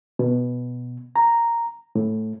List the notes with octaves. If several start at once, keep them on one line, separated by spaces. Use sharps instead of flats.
B2
A#5
A2